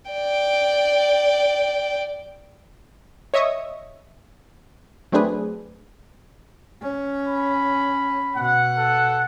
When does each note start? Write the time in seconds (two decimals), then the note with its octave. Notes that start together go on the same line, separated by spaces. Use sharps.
0.11 D5 G5
3.34 C#5 D#5 E5 C#6 D#6
5.12 F#3 A3 C4 D4 G#4 B4
6.81 C#4
7.28 B5
8.35 B2 F#5
8.77 A4